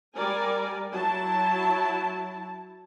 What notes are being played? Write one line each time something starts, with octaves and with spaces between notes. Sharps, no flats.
G3 A#4 D5 G#5
F#3 E4 A5